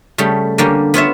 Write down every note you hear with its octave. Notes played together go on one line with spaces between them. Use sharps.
C#3 G3 A3
D3 G3 A#3 C#4
B3 F4 C#5 E5